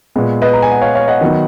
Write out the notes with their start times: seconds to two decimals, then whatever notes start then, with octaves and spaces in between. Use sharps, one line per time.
0.16 A#2 G#3 B3
0.42 B4 D#5
0.53 A#5
0.62 G#5
0.71 F#5
0.82 C#5 F5
0.95 C#5 F5
1.08 D#5 F#5
1.21 D#3 F#3 B3